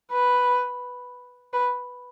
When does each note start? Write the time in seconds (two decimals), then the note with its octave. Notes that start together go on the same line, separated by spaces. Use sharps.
0.12 B4
1.53 B4